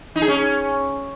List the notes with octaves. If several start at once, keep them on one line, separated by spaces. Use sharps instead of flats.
D#4
G#4
C#4